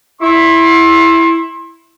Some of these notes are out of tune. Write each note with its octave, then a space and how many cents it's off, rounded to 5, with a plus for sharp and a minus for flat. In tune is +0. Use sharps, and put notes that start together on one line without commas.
E4 +0 C6 +30